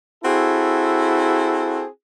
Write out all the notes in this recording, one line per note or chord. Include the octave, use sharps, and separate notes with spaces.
C4 E4 F#4 G#4 A4